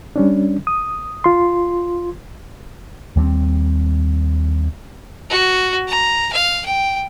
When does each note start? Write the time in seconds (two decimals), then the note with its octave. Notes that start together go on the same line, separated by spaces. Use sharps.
0.16 G3 C#4 D4
0.67 D#6
1.24 F4 C6
3.16 D#2 G3 A3 C4
5.30 F#4
5.88 A#5
6.33 F5
6.66 G5